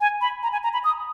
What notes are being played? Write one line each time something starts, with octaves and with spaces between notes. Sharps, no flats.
G#5
B5
A#5
G#5
A#5
B5
D#6